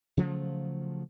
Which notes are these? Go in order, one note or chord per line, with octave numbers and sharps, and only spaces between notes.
C#3 F3 F#3 A3